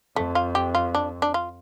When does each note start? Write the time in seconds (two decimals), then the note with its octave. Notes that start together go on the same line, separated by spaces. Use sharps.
0.16 F2 A3
0.35 F4
0.55 G4
0.75 F4
0.95 D4
1.22 D4
1.34 F4